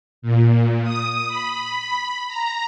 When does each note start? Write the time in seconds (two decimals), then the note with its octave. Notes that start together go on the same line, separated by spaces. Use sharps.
0.22 A#2
0.84 D#6
1.28 B5
2.28 A#5